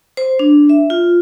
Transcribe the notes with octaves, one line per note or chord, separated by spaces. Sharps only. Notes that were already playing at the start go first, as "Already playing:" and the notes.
C5
D4
E5
F4